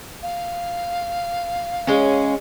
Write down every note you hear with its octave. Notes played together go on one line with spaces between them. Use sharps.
F5
G#3 C#4